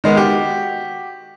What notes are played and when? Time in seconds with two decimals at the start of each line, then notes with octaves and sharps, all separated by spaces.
0.04 D#3 G#3 B3
0.17 F#4 G4